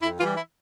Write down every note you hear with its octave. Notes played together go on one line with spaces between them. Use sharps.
F2 E4
E3 G3 F4
E4